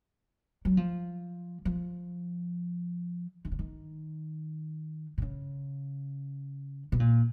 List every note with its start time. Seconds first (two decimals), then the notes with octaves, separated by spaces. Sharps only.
0.65 F#3
0.77 F3
1.65 F3
3.45 D#3
3.52 C#3
3.59 D#3
5.18 B2
5.22 C#3
6.92 B2
7.00 A#2